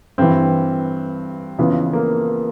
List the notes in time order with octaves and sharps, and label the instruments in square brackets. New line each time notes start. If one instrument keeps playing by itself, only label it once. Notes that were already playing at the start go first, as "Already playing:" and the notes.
[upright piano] G2 E3 C4
F2 C#3 E3 B3
A#3